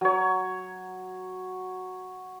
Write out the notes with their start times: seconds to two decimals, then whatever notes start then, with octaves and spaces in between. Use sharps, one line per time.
0.01 F#3 C#5